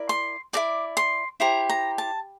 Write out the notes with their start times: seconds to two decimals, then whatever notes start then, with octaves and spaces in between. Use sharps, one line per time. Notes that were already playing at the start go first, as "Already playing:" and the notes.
Already playing: E4 A#4 D5
0.09 C6
0.53 E4 A#4 D5 D6
0.97 C6
1.40 E4 G4 C5 A#5
1.69 A#5
1.98 A5